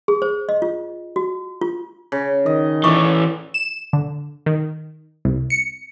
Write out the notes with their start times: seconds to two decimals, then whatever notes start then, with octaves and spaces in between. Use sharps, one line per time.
0.08 G#4
0.22 C5
0.49 D#5
0.62 F4
1.16 F#4
1.61 F4
2.12 C#3
2.46 D#3 D#5
2.84 E3 C#4 D5 C#6
3.54 E7
3.93 D3
4.46 D#3
5.25 C2
5.50 C#7